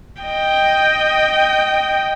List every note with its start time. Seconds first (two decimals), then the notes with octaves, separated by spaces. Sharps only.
0.23 D#5 G5